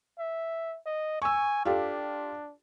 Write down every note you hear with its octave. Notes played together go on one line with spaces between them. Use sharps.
E5
D#5
G#5 C#6 E6
D4 F4 G4 A4